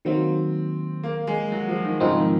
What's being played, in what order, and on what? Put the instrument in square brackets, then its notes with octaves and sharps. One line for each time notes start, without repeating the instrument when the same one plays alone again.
[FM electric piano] D#3 F#3 A#3 [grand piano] C4
[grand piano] A#3
G#3
F#3
F3
D#3
[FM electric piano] G#2 F3 C4 D#4 [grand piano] C#3
[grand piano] D#3